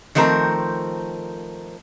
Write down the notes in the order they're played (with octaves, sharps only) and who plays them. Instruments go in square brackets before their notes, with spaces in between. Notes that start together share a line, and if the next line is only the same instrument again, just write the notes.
[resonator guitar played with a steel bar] D#3 F3 A3 C4 A#4 C5